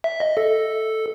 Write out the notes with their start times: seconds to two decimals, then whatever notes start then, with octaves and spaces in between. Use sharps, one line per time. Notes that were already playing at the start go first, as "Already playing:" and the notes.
0.04 E5
0.20 D#5
0.37 A4